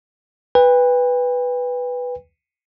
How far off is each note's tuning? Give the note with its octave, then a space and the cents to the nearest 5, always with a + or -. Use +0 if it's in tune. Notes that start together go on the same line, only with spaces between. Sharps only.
B4 +0 G5 +40